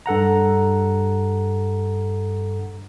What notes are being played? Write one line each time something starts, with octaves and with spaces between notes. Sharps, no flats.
G2 A4 F#5 A#5